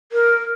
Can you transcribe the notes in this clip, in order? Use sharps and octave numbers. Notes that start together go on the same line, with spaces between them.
A#4